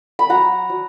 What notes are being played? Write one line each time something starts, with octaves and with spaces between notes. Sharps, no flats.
B5
F#3 F#5 A#5
F#3